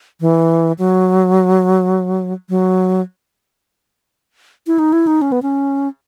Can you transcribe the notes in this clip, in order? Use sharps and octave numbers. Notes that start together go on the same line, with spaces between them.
E3
F#3
F#3
E4
D#4
E4
D#4
C#4
B3
C#4